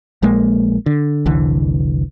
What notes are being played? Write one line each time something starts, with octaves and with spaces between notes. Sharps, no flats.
A#1 G#3 A#3
D3
F1 C2 D3 E3